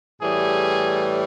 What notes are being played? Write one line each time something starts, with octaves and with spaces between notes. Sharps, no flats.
A2 E3 G3 G#4